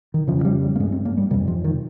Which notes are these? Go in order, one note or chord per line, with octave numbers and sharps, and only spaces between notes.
D#3
F2 C#3 F3
F3
G3
G3
A#3
G2 G#3
C4
A#3
G3
F2 C3 G3
F3
D#3